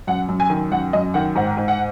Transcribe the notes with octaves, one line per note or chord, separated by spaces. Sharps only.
F#2 F#5
F#2
G#5
D#3
F#2 F#5
F#2 D#5
D#3 F#5
G#2 F#5
G#2
F#5